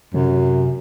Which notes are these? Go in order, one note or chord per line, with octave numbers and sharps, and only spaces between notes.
F#2 C3